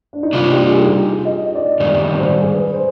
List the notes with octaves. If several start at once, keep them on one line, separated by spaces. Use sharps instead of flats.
D4
D#4
C3 G3 D4 F4
G4
G4
G#4
D#4
F4
D#5
D#5
D5
D#5
G#2 D#3 G3 D5
D5
C5
G#4
B4
C5